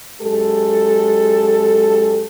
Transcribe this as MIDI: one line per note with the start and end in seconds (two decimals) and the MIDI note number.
0.21 2.25 42
0.21 2.25 56
0.21 2.25 67
0.21 2.25 69